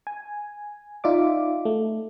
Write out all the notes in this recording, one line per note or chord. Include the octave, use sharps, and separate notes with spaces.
G#5
D#4 F4 D5 E5 D6
A3